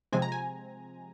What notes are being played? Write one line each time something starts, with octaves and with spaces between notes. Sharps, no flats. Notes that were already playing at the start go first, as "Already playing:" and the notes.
C3 F3 G#3 C4 G#5
A#5
G#5